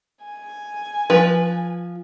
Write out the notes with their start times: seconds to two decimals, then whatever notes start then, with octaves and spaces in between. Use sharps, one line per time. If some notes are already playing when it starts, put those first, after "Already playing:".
0.24 G#5
1.10 F3 B4